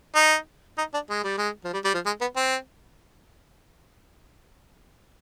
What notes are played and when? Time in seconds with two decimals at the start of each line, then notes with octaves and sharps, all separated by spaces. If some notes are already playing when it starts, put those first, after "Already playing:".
0.15 D#4
0.78 D#4
0.94 D4
1.10 G#3
1.24 G3
1.38 G#3
1.64 F3
1.73 G3
1.84 G3
1.94 F3
2.06 G#3
2.21 B3
2.36 C4